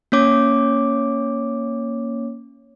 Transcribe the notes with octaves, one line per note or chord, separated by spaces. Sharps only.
A#3 C#4 C#5 D6